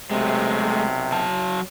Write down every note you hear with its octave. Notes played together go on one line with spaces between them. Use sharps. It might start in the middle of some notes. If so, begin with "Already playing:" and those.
B1 C3 G#3 A3
F#3 A5